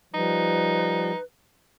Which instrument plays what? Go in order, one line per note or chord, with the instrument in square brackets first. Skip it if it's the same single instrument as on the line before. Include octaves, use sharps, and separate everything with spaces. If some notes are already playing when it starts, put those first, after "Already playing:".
[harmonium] F3 G3 [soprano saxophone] D#4 [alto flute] B4